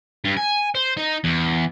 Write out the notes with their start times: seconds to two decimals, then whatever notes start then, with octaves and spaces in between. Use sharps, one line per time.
0.24 G2
0.37 G#5
0.75 C5
0.97 D#4
1.24 E2